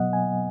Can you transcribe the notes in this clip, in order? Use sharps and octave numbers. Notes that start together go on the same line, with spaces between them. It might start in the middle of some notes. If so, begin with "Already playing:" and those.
Already playing: B2 F#3 B3 D#5 F#5
G#5